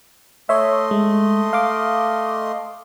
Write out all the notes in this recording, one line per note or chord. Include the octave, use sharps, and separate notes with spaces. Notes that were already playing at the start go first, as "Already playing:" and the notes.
A3 C#5 D#5 E5 C6
G#3
F5 D6